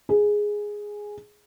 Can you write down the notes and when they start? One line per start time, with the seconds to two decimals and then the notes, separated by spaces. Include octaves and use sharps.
0.09 G#4